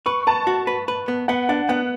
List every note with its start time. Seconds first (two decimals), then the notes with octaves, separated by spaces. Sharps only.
0.06 B4 C#6
0.27 B4 A5
0.47 F#4
0.67 B4
0.88 B4
1.08 B3
1.28 B3 F#5
1.49 D4 F#5
1.69 B3 F#5